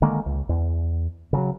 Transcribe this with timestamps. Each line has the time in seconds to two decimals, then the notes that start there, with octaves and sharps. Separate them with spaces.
0.02 D3 D#3 G#3 A#3
0.26 C#2
0.49 E2
1.33 C#3 F3 F#3